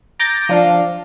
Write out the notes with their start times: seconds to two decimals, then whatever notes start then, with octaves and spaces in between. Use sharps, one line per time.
0.19 A#5 D6 G6 A6 A#6
0.49 F3 D4 F5